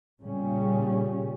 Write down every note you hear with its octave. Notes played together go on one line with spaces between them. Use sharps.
A#2 C#3 G3 C#4